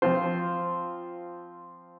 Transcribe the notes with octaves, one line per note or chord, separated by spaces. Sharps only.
F3 C4 F4 C5